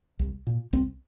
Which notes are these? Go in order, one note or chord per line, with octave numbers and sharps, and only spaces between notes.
C2
A#2
C2 C4